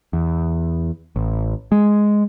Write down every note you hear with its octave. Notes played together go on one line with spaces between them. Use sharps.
E2
A1
G#3